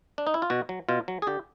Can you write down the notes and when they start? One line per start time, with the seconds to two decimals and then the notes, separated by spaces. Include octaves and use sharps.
0.18 D4
0.27 D#4
0.34 E4
0.42 F4
0.50 B2 F#4
0.69 F#3
0.89 B2 F4
1.08 F#3
1.22 G#4
1.27 D3 G4